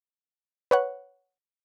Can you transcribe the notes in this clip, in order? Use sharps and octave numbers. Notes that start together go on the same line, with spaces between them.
B4 C#5 F#5